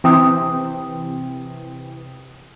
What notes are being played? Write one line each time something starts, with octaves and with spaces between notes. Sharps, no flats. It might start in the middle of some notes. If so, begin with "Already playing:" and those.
C3 E3 C4 G5 D#6